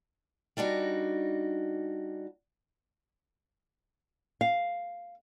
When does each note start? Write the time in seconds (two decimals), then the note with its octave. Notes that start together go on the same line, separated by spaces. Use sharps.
0.57 G3 D4 D#4 F#4
4.41 F5